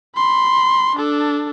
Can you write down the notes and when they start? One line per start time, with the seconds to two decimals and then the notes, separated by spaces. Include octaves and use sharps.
0.16 B5 C6
0.96 D4 A4